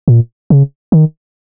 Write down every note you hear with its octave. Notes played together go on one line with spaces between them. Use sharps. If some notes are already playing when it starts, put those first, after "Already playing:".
A#2
C#3
D#3